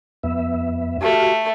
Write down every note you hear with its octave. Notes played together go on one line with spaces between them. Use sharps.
F2 B3 E5
A3 F#4 G4 F5